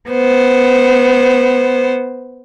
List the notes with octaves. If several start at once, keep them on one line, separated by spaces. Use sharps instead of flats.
B3 C5